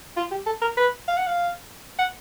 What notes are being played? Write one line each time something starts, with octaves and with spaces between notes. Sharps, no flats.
F4
G4
A4
A#4
B4
F5
F#5
F5
F#5